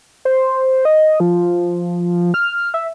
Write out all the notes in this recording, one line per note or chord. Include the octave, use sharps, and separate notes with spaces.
C5
D#5
F3
F6
E5